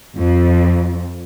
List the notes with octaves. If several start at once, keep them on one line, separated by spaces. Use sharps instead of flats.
F2